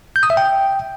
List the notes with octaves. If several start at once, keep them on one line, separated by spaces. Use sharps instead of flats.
G6
D#6
E5
G5